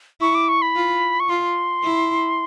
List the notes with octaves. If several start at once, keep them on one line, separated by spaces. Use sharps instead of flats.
E4 C#6
D6
C#6
B5
F4
C#6
F4 C6
E4